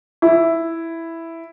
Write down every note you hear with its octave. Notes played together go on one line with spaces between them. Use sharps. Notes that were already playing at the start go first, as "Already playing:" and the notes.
E4